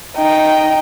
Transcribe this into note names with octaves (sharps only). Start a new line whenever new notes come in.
D#4 G5